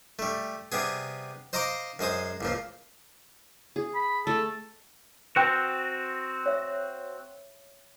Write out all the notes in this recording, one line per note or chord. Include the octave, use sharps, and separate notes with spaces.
G3 A3
C3 G3 B3 G#4
C5 D#5 F5 A#5 C6 D6
F#2 G#3 C5 D#6
C#2 A#2 F3
G#4
B5
A3 A4
C4 F#4 B4 G5 A5
C#5 E5